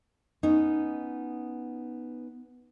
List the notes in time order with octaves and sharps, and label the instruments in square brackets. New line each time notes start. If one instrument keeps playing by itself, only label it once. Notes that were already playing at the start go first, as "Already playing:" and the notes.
[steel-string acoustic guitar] B3 C#4 D#4